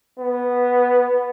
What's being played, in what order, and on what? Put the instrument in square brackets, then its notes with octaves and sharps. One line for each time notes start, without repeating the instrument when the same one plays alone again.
[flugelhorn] B3